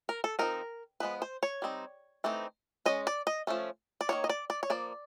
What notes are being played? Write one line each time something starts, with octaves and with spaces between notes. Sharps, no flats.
A#4
A4
F3 G#3 C4 D#4 A#4
F3 G#3 B3 B4
C5
C#5
G3 C4 D#4
E3 A3 C4 D#4
G#3 C#4 D#5
D5
D#5
F3 A3 C#4
D5
D#3 F#3 A#3 C#5
D#5
D5
D5
C#5
F3 A#3 D5